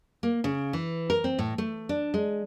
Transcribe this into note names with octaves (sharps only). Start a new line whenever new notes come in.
A#3
C#3
E3
A#4
C4
A2
A3
D4
G#3